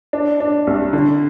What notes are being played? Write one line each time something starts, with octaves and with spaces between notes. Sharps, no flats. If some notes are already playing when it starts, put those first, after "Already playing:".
D4
D4
C2
D3